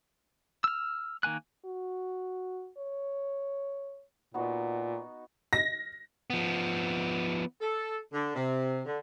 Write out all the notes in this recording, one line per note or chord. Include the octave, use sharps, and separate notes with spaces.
E6 F6
D#3 A#3 G#5 F#6
F#4
C#5
A#2 B3 D#4 F#4
A#6
F3 B3
A4
D3
C3
D3